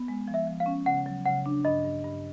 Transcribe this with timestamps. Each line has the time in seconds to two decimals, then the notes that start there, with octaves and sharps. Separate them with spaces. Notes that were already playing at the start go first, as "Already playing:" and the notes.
Already playing: B3
0.08 G#3
0.28 F3
0.34 E5
0.47 F3
0.60 F5
0.66 C#4
0.86 C#3 F#5
1.06 F#3
1.26 C#3 F#5
1.46 D4
1.65 G2 D#5
1.84 G2
2.04 G2